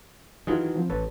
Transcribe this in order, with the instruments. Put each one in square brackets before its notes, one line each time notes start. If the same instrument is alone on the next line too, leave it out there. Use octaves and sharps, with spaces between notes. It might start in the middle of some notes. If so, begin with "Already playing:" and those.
[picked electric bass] D#3 E3 F#3 [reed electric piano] E4 F4 G#4
[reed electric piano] F3 C4
[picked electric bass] A1 [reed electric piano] A4 B4 C#5